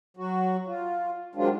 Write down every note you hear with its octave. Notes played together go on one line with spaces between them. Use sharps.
F#3 F#4
F4
D#3 F#3 G#3 C4 D4 F4